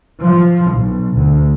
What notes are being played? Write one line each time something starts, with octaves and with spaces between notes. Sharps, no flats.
F3
B1
D2